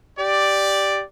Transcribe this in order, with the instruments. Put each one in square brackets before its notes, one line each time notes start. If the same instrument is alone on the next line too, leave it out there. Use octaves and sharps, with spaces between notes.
[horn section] G4 D5